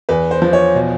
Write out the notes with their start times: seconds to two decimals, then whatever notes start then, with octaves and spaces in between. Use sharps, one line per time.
0.09 E2 B4
0.31 C5
0.42 F3
0.53 C#5
0.75 B2